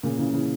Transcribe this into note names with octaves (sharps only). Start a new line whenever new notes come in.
A#2 C#3
C#3 E3
C#3 E3